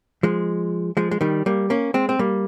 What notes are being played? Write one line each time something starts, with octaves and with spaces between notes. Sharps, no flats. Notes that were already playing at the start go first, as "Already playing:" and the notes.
F3 G#3
F3 G#3
G#3
D#3 G3
G3 A#3
A#3 C#4
G#3 C4
C4
G3 A#3